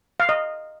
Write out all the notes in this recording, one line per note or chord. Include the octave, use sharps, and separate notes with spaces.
F5
D#5